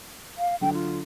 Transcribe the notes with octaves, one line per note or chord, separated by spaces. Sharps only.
F5
D3 F#3 G5
F4